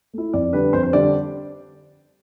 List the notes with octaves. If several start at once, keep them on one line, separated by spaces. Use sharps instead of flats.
A3 E4
F2 D5
D3 G3 D4 B4
F2 C5
C5
D3 G3 D4 D5